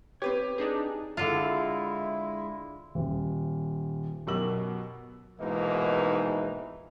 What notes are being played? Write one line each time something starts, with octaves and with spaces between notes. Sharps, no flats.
C4 G4 B4 C#5
D4 D#4 G#4
D3 G#3 E4 F4
D#1
F#2 B2 G4 A#4 E6 F#7
A#1 G#2 B2 E3 A#3 D#4